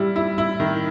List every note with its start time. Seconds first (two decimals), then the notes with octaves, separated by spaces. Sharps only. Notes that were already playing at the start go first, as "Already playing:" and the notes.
Already playing: G3 E4
0.16 E4
0.38 E4
0.60 D#3